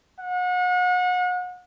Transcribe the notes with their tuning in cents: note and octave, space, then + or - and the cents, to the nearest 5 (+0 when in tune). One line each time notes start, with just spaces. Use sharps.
F#5 -35